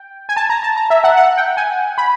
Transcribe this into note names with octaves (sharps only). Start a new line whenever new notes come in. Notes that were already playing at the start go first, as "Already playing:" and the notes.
Already playing: G5
G#5
A5
A#5
A5
A#5
E5
F#5
F#5
G5
G#5
B5